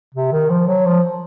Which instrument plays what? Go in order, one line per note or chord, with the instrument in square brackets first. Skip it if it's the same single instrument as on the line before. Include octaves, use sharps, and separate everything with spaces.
[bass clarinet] C3
D#3
F3
F#3
F3